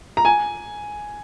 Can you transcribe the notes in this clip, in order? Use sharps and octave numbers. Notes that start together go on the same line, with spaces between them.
A#5
G#5